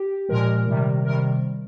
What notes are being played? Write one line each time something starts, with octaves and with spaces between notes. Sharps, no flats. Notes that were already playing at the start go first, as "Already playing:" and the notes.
Already playing: G4
A#2 F3 G#3 A#4
C3 D#3 G3
C3 D#3 G3 A#4